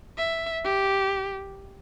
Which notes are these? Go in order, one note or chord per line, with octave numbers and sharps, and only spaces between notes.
E5
G4